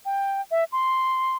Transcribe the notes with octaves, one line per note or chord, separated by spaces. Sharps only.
G5
E5
C6